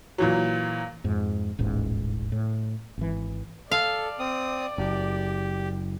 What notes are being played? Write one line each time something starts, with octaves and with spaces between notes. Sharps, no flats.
A#2 E3 F#3
F2 G#2
D#1 A1 G#2
A2
G#1 E3
A4 D5 F5
C4 D#6
F#1 G4